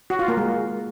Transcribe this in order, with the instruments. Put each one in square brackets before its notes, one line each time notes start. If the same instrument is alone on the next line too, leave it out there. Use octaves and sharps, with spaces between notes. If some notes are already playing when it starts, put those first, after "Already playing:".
[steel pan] F#4
F4
A#3
G#3